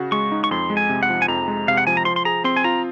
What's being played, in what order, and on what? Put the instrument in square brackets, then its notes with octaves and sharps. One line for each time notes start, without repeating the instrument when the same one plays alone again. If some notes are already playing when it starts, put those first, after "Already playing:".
Already playing: [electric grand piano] C#3 F#4
[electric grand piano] G#3 [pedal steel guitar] C#6
[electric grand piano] D#4
[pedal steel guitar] C#6
[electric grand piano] F2 [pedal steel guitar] C6
[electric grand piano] G#3
[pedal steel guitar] G#5
[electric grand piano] C3
[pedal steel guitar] F#5
[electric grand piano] F3
[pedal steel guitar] G#5
[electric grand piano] F2 [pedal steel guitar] A#5
[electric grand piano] G#3
[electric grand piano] C3 [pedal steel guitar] F5
[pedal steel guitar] F#5
[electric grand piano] F3 [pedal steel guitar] G#5
[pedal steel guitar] A#5
[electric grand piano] F3 [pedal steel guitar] C6
[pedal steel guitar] C6
[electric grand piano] G#4 [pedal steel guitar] A#5
[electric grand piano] C4 [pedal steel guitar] C6
[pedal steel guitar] G#5
[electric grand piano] F4 [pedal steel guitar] A#5